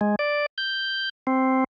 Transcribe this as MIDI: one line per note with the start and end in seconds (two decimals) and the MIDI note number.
0.01 0.15 56
0.19 0.46 74
0.58 1.09 91
1.27 1.64 60